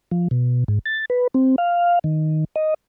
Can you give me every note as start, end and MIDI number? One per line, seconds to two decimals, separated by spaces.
0.11 0.28 53
0.31 0.64 47
0.68 0.79 44
0.86 1.05 93
1.10 1.27 71
1.34 1.56 60
1.58 1.99 77
2.04 2.44 51
2.56 2.74 75